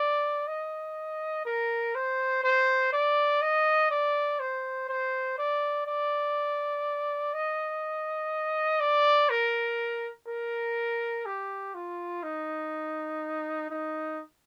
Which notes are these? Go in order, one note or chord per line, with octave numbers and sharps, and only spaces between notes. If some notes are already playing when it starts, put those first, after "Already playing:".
Already playing: D5
D#5
A#4
C5
C5
D5
D#5
D5
C5
C5
D5
D5
D#5
D5
A#4
A#4
G4
F4
D#4
D#4